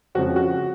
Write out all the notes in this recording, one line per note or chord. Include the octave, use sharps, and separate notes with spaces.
F2 C#3 F3 G#3 F#4
F#4